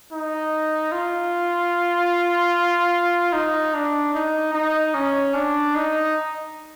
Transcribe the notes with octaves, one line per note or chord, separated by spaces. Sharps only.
D#4
F4
D#4
D4
D#4
D#4
C#4
D4
D#4